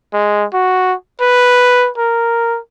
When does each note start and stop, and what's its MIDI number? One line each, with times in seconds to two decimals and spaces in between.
0.14 0.45 56
0.53 0.94 66
1.21 1.90 71
1.98 2.59 70